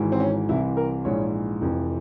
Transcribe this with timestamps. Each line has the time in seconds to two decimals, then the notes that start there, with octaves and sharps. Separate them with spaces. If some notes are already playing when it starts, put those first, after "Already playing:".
Already playing: G#1 G#2 E3
0.12 C4
0.20 C#4
0.49 C2 C3 E3 E4
0.77 A#4
1.05 A#1 G#2 E3 C#5
1.62 F1 F2 C3 E3